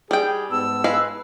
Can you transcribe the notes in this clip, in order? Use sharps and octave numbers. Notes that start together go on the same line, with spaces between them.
G3 G#4 G5
G#2 B3 A5 E6
G#3 B4 F5